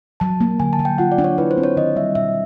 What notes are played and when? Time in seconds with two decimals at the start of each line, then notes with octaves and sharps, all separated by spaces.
0.20 F#3 A5
0.41 A#3
0.60 D3 G#5
0.73 A5
0.79 F#3
0.85 G5
0.98 F4 F#5
1.12 D5
1.18 D4
1.24 C#5
1.38 E4 B4
1.51 C5
1.57 C4
1.64 C#5
1.77 D#3 D#5
1.96 G3 E5
2.15 B2 E5